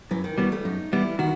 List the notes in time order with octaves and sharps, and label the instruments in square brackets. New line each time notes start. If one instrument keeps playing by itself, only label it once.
[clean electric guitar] F#2 [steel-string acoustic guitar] E3
[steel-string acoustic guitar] D#3
[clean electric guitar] E3 G3 B3 [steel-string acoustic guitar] F#3
[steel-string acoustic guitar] A3
[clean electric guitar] F#2 [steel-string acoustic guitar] D#4
[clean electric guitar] E3 G3 B3 [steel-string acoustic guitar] E4
[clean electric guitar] D#3 [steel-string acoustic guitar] F#4